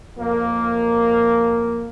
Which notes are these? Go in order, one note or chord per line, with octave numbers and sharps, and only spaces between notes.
F2 A#3